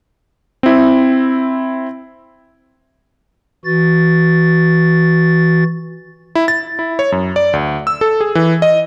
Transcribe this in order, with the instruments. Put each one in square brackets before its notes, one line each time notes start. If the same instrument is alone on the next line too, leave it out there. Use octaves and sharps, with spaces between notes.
[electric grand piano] C4 E4
[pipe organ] E3 F#4 A6
[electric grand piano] E4
A6
E4
C#5
F#2
D5
D2
E6
A4
G#4
E3
D#5